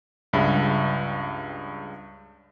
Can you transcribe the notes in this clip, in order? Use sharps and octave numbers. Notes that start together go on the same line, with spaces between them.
C#2 G2 C#3 E5 B5